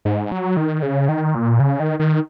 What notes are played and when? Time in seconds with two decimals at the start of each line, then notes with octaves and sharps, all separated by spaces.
0.05 G#2
0.32 F#3
0.57 D#3
0.82 C#3
1.09 D#3
1.35 A#2
1.60 C#3
1.80 D#3
1.99 D#3